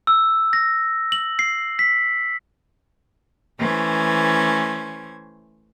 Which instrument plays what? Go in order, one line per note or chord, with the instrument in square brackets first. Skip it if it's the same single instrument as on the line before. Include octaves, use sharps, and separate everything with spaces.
[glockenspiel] E6
A#6
F#7
C7
B6
[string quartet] E3 A3 C#4 C5 G#6